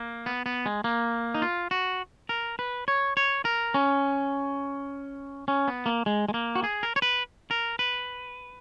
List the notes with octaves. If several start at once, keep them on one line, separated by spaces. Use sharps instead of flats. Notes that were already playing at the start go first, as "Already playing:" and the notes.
Already playing: A#3
B3
B3
G#3
A#3
D#4
F4
F#4
A#4
B4
C#5
C#5
A#4
C#4
C#4
B3
A#3
G#3
G#3
A#3
F#4
G#4
A#4
C#5
B4
A#4
B4